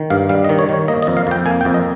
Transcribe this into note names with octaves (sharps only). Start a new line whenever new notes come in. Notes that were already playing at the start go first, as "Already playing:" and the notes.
Already playing: D#3
G2 F5
G3 F5
D#5
D#3
C#5
D#3 C#5
A#3 D#5
D#5
F2
F5
F2 G5
A#3 G#5
G5
F2
D#5